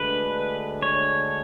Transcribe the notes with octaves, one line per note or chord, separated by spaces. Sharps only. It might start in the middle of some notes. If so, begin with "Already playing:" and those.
Already playing: D2 D3 G#3 D4 B4
C#5